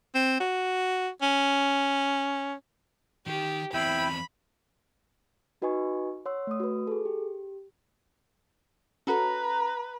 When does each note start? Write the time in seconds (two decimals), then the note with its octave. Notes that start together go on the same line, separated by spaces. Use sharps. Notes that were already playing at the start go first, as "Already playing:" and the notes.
0.15 C4
0.40 F#4
1.22 C#4
3.27 D#3 G4
3.74 E2 C4 E4 G5 B5
5.62 D#4 F#4 B4 D#5 G#5 C#6
6.26 C#5 F#5 C6 E6
6.47 A3 D#6
6.60 F#4 B4
6.87 G#4 A4
7.05 G4
9.07 C#4 F#4 A4 B4 A#5